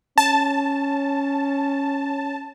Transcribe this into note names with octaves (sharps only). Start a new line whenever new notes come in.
C#4 A5